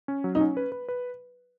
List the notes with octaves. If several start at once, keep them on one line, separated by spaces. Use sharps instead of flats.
C#4
F#3
D#4
C#4
B4
B4
B4